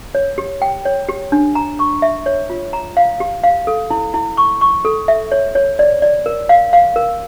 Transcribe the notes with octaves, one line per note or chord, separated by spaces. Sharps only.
C#5
G4
G5
C#5
G4
D4
A#5
C#6
E5
C#5
F4
A#5
F5
G4
F5
A4
E4
E4
C#6
C#6
A4
E5
C#5
C#5
D5
D5
A#4
F5
F5
A#4